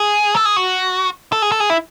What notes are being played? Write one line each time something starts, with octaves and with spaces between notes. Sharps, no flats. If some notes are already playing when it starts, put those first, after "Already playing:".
Already playing: G#4
A4
G#4
F#4
A4
G#4
A4
G#4
E4